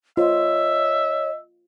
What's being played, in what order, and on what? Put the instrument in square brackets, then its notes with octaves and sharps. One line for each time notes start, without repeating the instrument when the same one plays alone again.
[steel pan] F4 C5 [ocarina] C#5 [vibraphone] D#5 [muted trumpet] E5